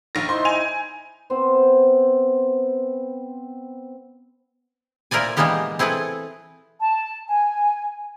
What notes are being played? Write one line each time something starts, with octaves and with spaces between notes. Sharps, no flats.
A#1 A#6
D#4 E4 C5 C6
G#5 F7
B3 C4 C5
A#2 E4 A#4 C5 D5 G#5
E3 G3 G#3 A#3 B3 G4
C4 E4 G#4 A4 B4
A5
G#5